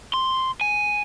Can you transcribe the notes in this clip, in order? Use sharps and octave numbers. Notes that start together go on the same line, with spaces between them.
C6
G#5